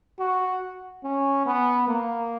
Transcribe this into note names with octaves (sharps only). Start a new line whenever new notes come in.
F#4
C#4
B3
A#3